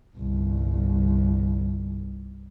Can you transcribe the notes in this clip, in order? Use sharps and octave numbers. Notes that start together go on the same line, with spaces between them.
G1 C2